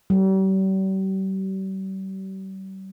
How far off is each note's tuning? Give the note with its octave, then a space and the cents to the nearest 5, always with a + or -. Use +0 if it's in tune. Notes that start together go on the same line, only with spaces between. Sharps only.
G3 -40